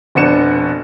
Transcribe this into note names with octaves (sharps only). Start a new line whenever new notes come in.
F1 B2 B3 D4 C#7 E7